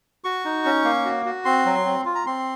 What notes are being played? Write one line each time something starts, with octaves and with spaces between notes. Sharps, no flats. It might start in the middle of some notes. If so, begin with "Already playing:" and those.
F#4 C#6
D#4
C#4
A#3
F#4
F#4
C4 C6
F#3
C4
F4
A#5
C4 C6